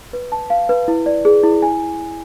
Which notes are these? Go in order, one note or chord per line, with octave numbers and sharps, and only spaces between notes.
B4
A5
F5
B4
E4
D5
G#4
E4
G#5